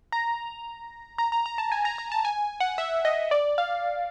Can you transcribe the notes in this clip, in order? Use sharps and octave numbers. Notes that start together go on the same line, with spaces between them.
A#5
A#5
A#5
A#5
A5
G#5
A#5
A#5
A5
G#5
F#5
E5
D#5
D5
F5